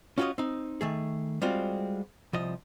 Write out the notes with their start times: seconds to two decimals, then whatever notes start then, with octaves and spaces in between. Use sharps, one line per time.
0.18 C#4 F4 F#4 B4 C#5 D#5
0.38 C4 D#4
0.81 D#3 A3 G#4
1.42 G3 G#3 C4 F4 F#4
2.33 C2 F3 D#5